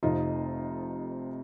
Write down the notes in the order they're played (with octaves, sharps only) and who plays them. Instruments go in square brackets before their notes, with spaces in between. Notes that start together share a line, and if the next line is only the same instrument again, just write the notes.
[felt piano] F1 F2 C3 D#4 F4